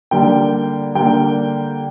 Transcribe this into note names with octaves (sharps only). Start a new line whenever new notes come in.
D3 G3 A#3 G5
D3 G3 A#3 G5